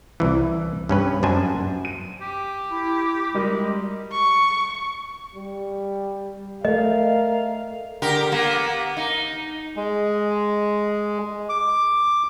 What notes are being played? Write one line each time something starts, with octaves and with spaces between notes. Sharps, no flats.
C2 E3
G2 C#4 B4
F#2 D4 C5 G#5
D#7
G4
E4
G3 G#3 A#4 D#5
C#6
G3
A3 A#4 D#5 F5
D3 G4 A#4
A#3 B3
D#4
G#3
D6